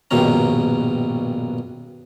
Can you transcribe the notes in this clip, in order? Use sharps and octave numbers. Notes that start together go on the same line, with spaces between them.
A#1 G2 B2 D#3 C#4 A#5